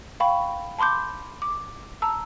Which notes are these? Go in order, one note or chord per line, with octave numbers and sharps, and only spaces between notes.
F5 G5 B5 C#6
A5 B5 C6 D6 G6
D6
A5 A#5 E6